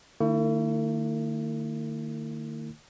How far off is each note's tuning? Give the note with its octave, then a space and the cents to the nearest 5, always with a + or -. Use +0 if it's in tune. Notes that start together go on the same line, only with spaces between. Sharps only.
D#3 -45 A3 +45 E4 +0